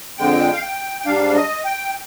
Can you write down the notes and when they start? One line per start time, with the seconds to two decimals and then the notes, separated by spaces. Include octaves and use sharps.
0.18 F2 D3 G#3 G5
0.53 F5
0.62 G5
1.01 G5
1.06 G#2 G3 D4 F5
1.35 D#5
1.65 G5